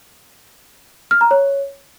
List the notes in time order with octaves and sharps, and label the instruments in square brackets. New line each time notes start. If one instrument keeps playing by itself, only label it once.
[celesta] F6
A#5
C#5